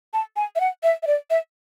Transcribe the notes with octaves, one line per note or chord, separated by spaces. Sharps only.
A5
G#5
E5
F#5
E5
E5
D5
E5